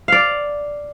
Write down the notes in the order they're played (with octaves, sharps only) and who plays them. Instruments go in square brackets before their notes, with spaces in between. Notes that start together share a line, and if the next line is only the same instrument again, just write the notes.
[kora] D5 F5